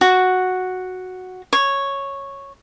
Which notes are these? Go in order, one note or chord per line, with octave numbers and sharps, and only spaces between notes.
F#4
C#5